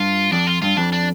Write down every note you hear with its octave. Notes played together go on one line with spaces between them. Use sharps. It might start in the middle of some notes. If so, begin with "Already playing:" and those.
Already playing: G2 F4
F2 D4
F4
G2 F4
F2 D4
D4